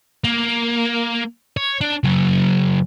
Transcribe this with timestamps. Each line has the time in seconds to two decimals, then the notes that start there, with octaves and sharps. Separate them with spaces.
0.24 A#3
1.57 C#5
1.81 D4
2.04 C#3 F#3